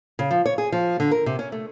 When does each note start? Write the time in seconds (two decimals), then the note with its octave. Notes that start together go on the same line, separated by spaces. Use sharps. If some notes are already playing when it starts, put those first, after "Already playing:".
0.19 C#3
0.31 F3
0.46 C#5
0.58 G#4
0.72 F3
1.00 D3
1.11 A#4
1.26 C3
1.39 C#4
1.52 A3